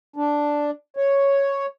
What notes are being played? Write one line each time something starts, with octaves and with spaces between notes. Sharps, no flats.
D4
C#5